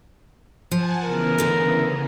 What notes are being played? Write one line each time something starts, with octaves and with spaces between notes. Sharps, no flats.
F3 F#5 G#5 A5
C#3 E3 B3 A#4
D3 A3